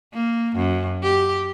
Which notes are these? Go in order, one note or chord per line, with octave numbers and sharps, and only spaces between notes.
A#3
F#2
G4